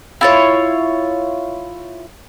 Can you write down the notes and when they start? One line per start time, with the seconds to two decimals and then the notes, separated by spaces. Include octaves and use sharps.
0.21 E4 F4 C#5